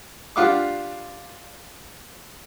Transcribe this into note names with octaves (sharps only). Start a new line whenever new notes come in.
D4 F4 G4 F5 F#5 D6